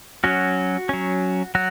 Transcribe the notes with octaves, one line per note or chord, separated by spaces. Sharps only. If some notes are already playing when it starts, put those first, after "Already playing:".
F#3 C#4 F#4
F#3 C#4
F#3 F#4